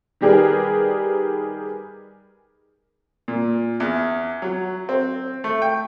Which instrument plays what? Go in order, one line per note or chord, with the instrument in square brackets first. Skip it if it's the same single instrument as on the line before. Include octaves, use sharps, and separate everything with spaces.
[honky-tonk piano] D#3 G3 G4 G#4 A#4 B4
[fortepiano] A#2
E2
F#3
C4
A3
G5